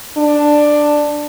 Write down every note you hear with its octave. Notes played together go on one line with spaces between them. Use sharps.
D4